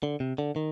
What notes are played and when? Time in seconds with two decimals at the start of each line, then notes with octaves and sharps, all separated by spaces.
0.03 D3
0.20 C3
0.38 D3
0.56 D#3